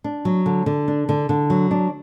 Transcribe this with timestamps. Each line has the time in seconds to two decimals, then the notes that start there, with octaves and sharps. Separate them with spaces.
0.04 D4
0.25 F#3
0.46 D3
0.66 D3
0.88 D4
1.09 D3
1.29 D3
1.50 F#3
1.71 D4